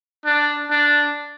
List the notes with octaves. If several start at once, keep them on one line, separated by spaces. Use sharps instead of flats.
D4
D4